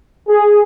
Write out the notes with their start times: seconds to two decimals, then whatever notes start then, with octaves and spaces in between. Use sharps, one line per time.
0.29 G#4